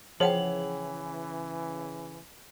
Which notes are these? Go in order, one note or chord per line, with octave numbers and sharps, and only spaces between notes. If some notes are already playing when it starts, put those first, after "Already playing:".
C#3 E3 F3 G#4 C#5 F#5 G5 F#7